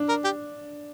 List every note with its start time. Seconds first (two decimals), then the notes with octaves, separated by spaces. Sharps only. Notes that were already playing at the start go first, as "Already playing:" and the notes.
Already playing: D4
0.09 A#4
0.24 G4